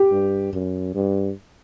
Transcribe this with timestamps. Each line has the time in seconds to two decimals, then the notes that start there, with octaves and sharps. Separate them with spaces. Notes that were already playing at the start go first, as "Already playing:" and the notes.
Already playing: G4
0.11 G2
0.53 F#2
0.95 G2